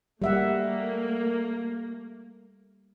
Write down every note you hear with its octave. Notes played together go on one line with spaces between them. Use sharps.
G3 A3 A#3 E5 F#5